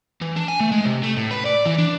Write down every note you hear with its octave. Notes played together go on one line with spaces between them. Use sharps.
E3
D4
G#5
A3
G#3
C3
A3
A2
B4
D5
E3
D4